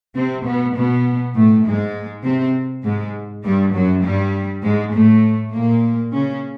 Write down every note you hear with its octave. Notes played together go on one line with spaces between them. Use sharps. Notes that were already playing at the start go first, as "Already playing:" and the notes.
C3 C4
B2 B3
B2 B3
A2 A3
G#2 G#3
C3 C4
G#2 G#3
G2 G3
F#2 F#3
G2 G3
G#2 G#3
A2 A3
A#2 A#3
C#3 C#4